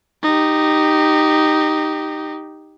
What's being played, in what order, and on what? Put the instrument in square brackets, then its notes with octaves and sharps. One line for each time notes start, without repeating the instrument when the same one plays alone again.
[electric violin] D#4 G4